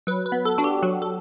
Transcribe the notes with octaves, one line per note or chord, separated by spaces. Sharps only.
F#3 B4
B4
B3
A4
D4 F#4
G4
F#3 F#4
A4